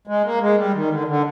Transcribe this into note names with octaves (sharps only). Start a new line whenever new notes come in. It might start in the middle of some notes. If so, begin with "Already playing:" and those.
G#3
A#3
G#3
G3
D#3
D3
D3